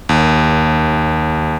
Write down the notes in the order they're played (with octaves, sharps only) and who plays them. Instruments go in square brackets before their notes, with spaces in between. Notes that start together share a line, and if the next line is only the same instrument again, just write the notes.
[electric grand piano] D#2